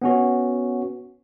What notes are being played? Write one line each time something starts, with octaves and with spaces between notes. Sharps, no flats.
B3 C#4 F#4